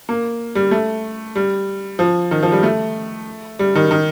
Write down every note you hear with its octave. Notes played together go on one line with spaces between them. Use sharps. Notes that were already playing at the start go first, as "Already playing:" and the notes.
A#3
G3
A3
G3
F3
D#3
F3
G3
A3
G3
D#3
D#3